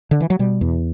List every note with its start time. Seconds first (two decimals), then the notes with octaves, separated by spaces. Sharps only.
0.11 D3
0.20 E3
0.30 F#3
0.39 B2 G3
0.61 E2